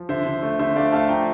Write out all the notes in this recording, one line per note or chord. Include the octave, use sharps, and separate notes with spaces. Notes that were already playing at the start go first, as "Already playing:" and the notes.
Already playing: F3
D3 C5 E5
D3
A3
D3 C5 E5
A3 D5 F5
A3 F5 A5
F3 G5 A#5